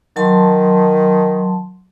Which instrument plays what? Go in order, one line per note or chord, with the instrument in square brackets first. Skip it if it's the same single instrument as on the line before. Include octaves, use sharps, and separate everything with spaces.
[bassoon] D#3 [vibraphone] F#3 A5 C6